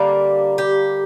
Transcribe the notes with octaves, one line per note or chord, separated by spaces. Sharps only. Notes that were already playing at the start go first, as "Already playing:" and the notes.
Already playing: D3 G3 A#3
G4